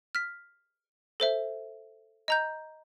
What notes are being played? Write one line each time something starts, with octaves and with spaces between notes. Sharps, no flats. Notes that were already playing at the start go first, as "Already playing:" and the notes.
F6 B6
A4 C5 E5
D#5 A#5 G6